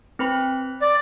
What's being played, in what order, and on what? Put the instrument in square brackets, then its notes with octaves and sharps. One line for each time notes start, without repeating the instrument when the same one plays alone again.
[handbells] C4 B4 B5
[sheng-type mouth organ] D5